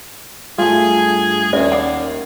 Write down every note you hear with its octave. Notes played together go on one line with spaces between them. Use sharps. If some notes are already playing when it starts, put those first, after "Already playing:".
G2 A3 F4 G#4
D#2 C#4 D5 E5
D5 F#5